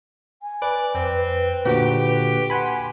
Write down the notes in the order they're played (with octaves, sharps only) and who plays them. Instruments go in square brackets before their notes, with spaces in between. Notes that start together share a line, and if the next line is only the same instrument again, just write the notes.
[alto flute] G#5
[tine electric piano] B4 [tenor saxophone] D5
[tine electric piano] F2 [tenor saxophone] C4 [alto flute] B4
[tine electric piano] A#2 D3 F#4 [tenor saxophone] G4
[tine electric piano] F#5 G#5 B5 [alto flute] C6